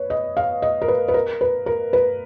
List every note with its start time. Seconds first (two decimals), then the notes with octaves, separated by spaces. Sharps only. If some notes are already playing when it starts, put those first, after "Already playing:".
Already playing: B4 C#5
0.10 D#5
0.37 F5
0.62 D#5
0.82 A#4
0.88 B4
1.08 B4
1.14 A#4
1.41 B4
1.66 A#4
1.93 B4